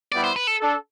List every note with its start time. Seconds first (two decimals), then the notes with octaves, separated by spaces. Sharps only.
0.12 G3 B3 E4 G4 D5
0.24 C5
0.36 B4
0.47 A4
0.60 D4 A4